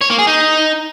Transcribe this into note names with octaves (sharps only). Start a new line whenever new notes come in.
C#5
A#3
G#4
D#4